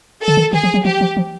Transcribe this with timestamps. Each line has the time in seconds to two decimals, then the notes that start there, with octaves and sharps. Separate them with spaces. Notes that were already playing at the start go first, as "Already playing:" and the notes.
0.22 A4
0.28 D3
0.37 D#3
0.53 D#3 G#4
0.63 F3
0.74 F#3
0.85 F3 G4
1.01 F3
1.17 F3